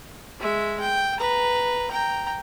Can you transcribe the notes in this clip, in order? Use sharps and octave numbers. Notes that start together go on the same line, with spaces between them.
G#3 E5
G5
B4 A#5
G5 A#5